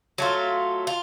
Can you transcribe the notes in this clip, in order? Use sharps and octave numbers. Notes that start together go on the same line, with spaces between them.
F#3 A3 F4
F4